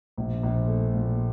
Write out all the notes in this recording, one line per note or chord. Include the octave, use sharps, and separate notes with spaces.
A#1
A#1
A3
A#2